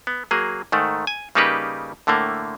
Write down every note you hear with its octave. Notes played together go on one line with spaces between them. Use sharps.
B3
F#3 A#3 G#4
G#2 D#3 A3
G#5
C#3 G3 A#3 D#4 G4 B4
A2 D3 A3 A#3